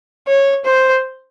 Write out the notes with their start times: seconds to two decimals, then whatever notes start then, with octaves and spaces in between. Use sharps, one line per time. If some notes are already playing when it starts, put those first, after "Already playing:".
0.27 C#5
0.65 C5